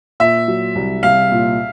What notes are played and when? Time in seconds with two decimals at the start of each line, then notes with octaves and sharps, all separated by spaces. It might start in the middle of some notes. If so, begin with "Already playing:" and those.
0.20 A#2 E5
0.48 F#3
0.75 C2
1.03 C2 F5
1.31 A#2